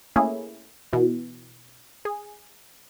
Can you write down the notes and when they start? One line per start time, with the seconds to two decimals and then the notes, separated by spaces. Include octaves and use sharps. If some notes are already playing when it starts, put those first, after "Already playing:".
0.16 A3 A#3 C#4 E4 G#4
0.93 B2 E3
2.05 G#4